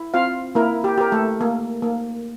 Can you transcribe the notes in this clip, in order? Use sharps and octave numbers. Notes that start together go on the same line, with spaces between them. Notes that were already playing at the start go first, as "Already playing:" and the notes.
Already playing: E4
C4 F4 F5
A#3 E4 A#4
G4
G4 A#4
A3 A4
A#3
A#3